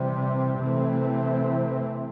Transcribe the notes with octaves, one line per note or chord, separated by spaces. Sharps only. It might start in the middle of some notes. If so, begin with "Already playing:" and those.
Already playing: C3 E3 G3 C4
C3 E3 A3 C4